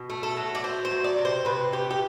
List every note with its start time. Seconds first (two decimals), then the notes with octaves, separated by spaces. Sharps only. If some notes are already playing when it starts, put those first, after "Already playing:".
Already playing: B2
0.10 A3
0.23 A4
0.37 F#3
0.55 D5
0.64 A3 C5
0.85 C5
0.91 F#3
1.04 D5
1.18 C3
1.25 C5
1.45 C3 B4
1.72 A3 G4
1.91 G4